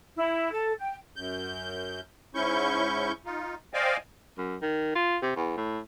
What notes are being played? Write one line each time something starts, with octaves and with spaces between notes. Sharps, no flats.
E4
A4
G5
F#2 G6
G#2 C#4 E4 C#6 G6
D#4 F4
C5 D5 D#5 F5 G5 G#5
F#2
D#3
F4
C3
E2
A2